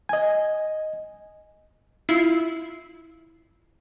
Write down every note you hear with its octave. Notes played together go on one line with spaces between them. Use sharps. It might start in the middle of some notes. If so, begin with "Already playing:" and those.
D#5 G#5
E4 F4 C7